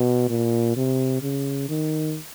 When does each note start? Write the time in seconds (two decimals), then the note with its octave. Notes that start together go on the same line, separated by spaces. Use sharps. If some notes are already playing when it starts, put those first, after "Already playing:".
Already playing: B2
0.29 A#2
0.76 C3
1.22 C#3
1.69 D#3